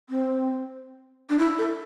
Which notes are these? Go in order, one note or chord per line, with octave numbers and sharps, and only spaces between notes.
C4
D4
E4
A4